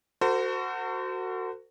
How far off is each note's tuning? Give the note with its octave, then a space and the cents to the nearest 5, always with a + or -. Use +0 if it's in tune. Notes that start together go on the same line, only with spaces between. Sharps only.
F#4 +0 A4 +45 C5 -25